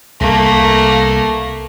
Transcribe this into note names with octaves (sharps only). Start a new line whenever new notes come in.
C2 A3 A#3